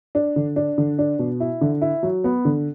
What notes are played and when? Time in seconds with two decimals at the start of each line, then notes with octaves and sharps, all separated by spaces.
0.15 D4
0.36 D3
0.56 D4
0.78 D3
0.99 D4
1.19 B2
1.40 E4
1.61 D3
1.81 E4
2.03 F#3
2.24 B3
2.45 D3